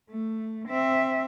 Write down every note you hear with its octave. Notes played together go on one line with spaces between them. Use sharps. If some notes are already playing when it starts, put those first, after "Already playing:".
A3
C4 E5